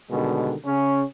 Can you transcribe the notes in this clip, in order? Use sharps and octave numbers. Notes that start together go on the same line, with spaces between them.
B2 D3 D#3 G3 G#3
C#3 C#4